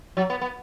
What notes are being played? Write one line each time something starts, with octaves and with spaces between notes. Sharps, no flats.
F#3
B3
B3